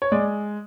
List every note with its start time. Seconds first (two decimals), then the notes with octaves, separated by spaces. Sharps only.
0.02 C#5
0.12 G#3 D5